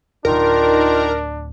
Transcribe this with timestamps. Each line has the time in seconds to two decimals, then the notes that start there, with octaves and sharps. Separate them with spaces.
0.25 D1 G1 D#3 D4 D#4 F4 A#4